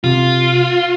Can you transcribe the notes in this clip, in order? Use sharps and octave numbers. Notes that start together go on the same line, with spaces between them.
C3 F4